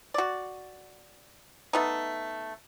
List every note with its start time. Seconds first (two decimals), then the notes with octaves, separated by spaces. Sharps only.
0.14 F#4 D5
1.73 A3 B3 D#4